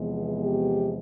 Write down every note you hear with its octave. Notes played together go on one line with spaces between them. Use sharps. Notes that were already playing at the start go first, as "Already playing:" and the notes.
Already playing: E2 C3 F3 G#3 B3
G4